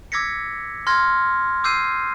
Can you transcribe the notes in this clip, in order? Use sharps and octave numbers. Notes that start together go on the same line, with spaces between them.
D6 E6 G#6 A#6 B6 C#7
C6 F6 G#6 A#6
D6 E6 G6 C7 D#7